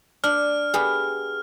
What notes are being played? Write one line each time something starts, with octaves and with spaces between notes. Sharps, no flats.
D4 F6
B3 G4 G#4